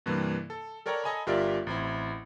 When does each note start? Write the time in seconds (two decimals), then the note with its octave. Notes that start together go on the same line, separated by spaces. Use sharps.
0.06 G2 C3 E3 A#3
0.50 A4
0.86 A4 A#4 C#5 D5 G5 A#5
1.04 A4 D#5 G#5 A#5 B5
1.26 G1 F4 G4 A#4 D5 E5
1.67 A1 C4 E4